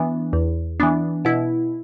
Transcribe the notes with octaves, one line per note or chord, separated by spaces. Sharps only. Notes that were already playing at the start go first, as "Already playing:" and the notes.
Already playing: E3 B3 D4
E2
E3 B3 D4
B2 E4